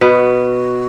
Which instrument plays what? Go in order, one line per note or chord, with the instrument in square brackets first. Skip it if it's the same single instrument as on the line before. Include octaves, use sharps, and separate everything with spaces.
[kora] B2 B3 [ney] F#4